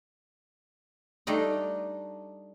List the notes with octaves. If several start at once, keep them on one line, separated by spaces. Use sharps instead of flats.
G3 A3 D4 D#4 D5 D#5